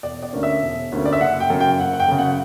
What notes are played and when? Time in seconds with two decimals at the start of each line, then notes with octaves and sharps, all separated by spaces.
0.03 E1 D5
0.23 D5
0.33 D2 D3 A#3 C#4
0.43 E5
0.62 E1
0.92 D2 D3 A#3 C#4
1.05 D5
1.13 E5
1.20 F#1 F#5
1.40 G5
1.50 F#2 C#3
1.61 G5
1.80 F#1 F#5
1.93 F#5
2.00 G5
2.08 F#2 C#3
2.19 F#5